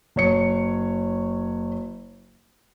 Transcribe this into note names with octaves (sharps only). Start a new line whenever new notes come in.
F#1 C#5 C#7